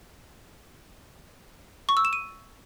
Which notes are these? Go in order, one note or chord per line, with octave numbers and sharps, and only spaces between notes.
C#6
E6
E7
D#7